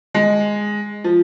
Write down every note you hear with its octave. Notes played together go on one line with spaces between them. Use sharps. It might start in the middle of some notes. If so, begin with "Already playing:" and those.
G#3
F3